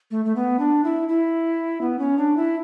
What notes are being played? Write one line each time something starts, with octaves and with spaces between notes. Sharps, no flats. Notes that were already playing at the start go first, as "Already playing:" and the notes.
A3
A3
B3
D4
E4
E4
B3
C#4
D4
E4